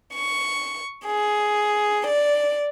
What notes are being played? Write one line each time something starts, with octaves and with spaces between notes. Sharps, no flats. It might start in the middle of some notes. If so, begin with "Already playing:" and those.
C#6
G#4
D5